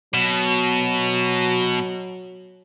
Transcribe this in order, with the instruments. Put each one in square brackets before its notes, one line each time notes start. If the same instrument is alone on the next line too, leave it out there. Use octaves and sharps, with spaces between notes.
[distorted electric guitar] B2 [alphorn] F#3